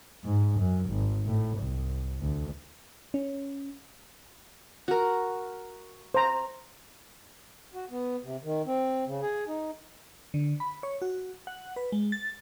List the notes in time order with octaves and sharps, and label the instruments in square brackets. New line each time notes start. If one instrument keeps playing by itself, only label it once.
[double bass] G#2
F#2
G#1
A2
C2
D2
[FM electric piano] C#4
[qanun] F#4 A#4
[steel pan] C5 A#5
[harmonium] F#4
B3
C3
D#3
C4
C#3
G#4
D#4
[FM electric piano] D3
B5
C#5
F#4
F#5
B4
G#3
A6